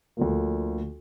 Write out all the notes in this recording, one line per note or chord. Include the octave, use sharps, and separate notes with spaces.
D2 D3 F3 A#3